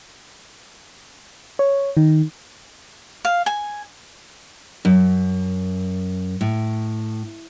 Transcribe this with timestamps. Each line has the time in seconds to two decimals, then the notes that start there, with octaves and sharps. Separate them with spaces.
1.59 C#5
1.97 D#3
3.25 F5
3.46 G#5
4.85 F#2
6.41 A2